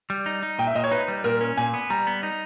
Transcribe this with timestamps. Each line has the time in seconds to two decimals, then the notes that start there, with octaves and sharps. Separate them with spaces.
0.10 G3
0.26 D#4
0.43 D#4
0.59 A#2 G5
0.67 E5
0.75 A#2 D#5
0.84 C#5
0.91 D#4 B4
1.08 G3
1.24 A#2 A#4
1.41 C#4
1.57 A#2 G#5
1.74 B3
1.90 G3 A#5
2.07 B3
2.23 D#4